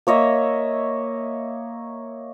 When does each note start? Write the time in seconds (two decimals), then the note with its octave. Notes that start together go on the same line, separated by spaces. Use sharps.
0.07 A#3 C#5 D#5 E5